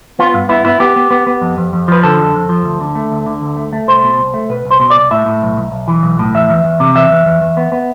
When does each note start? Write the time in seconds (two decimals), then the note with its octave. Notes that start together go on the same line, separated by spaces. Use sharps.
0.19 B3 F4
0.34 G2
0.49 B3 E4
0.65 B3 E4
0.80 B3 G4
0.96 B3
1.11 B3
1.27 B3
1.41 F2
1.58 F2
1.73 F2
1.88 F3 B4
2.03 D3 A4
2.18 F2
2.34 F2
2.49 F3
2.64 D2
2.81 D3
2.95 A3
3.12 D2
3.26 D3
3.42 D2
3.57 A3
3.73 A3
3.87 C2 C5
4.03 B2
4.18 C2
4.34 A3
4.49 B2 B4
4.65 C2
4.71 C5
4.80 B2
4.90 C2 D5
5.11 A2 E5
5.26 A2
5.42 B1
5.57 B1
5.72 B1
5.88 E3
6.03 B1
6.19 A2
6.34 E2 E5
6.50 E2
6.64 E2
6.80 C3
6.95 E2 E5
7.11 E2
7.26 E2
7.42 E2
7.57 B3
7.72 B3